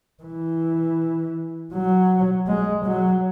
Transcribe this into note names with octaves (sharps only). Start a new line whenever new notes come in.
E3
F#3
G#3
F#3